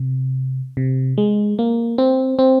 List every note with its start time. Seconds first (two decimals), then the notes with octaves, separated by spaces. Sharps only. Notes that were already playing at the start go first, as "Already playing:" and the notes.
Already playing: C3
0.77 C3
1.18 G#3
1.59 A#3
1.98 C4
2.39 C4